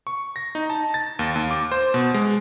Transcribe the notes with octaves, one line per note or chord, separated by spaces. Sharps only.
C#6
A#6
D#4
A5
A6
D#2
D#2
D6
C5
B2
G#3